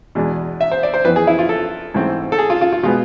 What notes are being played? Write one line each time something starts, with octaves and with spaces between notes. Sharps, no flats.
E2 B2 G#3 D4
E5
C5
D5
C5
F2 E3 B3 B4
G#4
E4
F4
A4
G#2 E3 A3 C4
A4
G#4
F4
F4
F4
B2 G#3 B3 F4